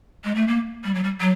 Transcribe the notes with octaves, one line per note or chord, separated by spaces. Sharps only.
G#3
A3
A#3
G3
F#3
G3
F#3